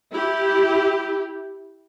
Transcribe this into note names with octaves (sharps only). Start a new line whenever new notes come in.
E4 G4